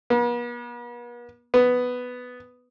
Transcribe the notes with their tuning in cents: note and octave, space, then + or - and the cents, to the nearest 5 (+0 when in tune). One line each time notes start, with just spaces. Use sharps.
B3 -45
B3 +5